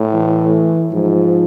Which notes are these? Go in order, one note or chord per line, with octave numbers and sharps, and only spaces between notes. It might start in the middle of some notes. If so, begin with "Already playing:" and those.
Already playing: A2
E3
G#2 F3